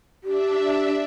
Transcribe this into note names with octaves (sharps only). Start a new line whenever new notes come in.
D4 G4 E5